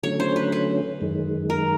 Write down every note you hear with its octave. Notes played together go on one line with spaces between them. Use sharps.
D3 F#3 A3 C#4 C#5
C5
B4
B4
F#2 D#3 G#3
A#4